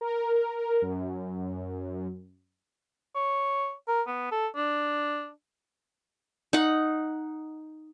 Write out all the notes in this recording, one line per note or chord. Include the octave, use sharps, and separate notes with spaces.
A#4
F#2
C#5
A#4
B3
A4
D4
D#4 F#5